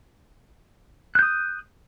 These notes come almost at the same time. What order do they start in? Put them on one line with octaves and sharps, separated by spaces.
F#6 G6 D#6